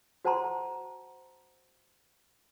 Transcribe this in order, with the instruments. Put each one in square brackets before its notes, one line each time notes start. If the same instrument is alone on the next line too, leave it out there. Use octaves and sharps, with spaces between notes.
[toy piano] F#4 C5 F#5 A5 A#5 C6